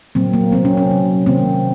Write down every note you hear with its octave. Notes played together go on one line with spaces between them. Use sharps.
A#2 F#3 A#3 C4
A#3
C3 F#3 A#3 C4
C#4
C#4
C3 F#3 A#3
C3 D#3 A#3 C4